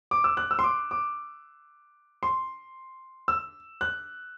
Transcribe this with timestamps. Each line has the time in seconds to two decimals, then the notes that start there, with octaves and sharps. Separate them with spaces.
0.11 D6
0.24 E6
0.37 F#6
0.51 E6
0.59 C6
0.64 D6
0.91 D6
2.23 C6
3.28 E6
3.81 F#6